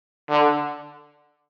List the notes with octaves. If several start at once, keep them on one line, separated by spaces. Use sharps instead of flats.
D3